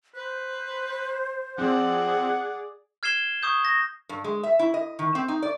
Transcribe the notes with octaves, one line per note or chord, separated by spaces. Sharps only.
B4 C5
F3 C4 G#4 D5 F#5
F6 G#6 C7 E7 G7
C#6 D#6 G6
A#6
G2
G#3
E5
E4
D#5
D#3
C4
D#4
D5